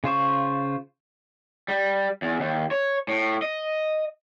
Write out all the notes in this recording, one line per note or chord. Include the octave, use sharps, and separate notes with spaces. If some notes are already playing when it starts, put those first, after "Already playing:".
C#3 F4 C5 C#6
G3
E2
D#2
C#5
A2
D#5